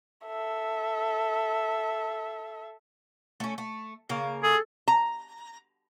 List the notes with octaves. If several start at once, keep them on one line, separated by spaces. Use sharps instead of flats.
A4 E5
A3 C#4
A3
C#3 A#3 A#4
G#4 A4
A#5